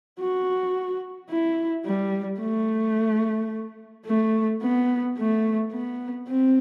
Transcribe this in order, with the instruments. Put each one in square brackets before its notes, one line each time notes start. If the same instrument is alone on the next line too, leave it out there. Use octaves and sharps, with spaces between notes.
[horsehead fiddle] F#4
E4
G3
A3
A3
B3
A3
B3
C4